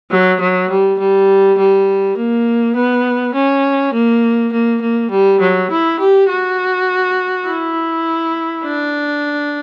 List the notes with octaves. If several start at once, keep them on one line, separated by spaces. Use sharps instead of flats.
F#3
F#3
G3
G3
G3
A#3
B3
C#4
A#3
A#3
A#3
G3
F#3
E4
G4
F#4
E4
D4